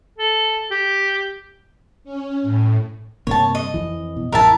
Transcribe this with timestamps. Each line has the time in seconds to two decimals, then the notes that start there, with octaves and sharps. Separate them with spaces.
0.18 A4
0.71 G4
2.04 C#4
2.42 A2
3.27 G2 C3 A#3 C#5 A5
3.55 D#5
3.74 F2 E3
4.16 B2
4.32 A1 F2 E3 A#4 E5 A5